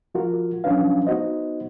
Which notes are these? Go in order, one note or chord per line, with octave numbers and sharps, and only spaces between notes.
F3 F4 F#4 A#4
F3 F#3 C#4 D4 B4 F5
B3 D#4 F#4 C5 D#5